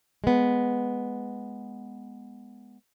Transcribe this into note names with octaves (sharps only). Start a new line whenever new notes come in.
G#3 B3